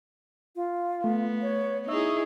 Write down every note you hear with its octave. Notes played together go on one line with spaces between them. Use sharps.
F4
A3 B3
C#5
D#4 E4 G#4 E5 C#6